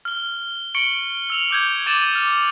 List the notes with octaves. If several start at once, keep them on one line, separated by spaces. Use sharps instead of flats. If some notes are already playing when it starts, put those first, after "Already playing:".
F6 G7
C#6 C#7 D7 F#7 G7
E6 F7 F#7
D6 G6 G#6
D6 G#6 A6 D#7 E7 F#7
F6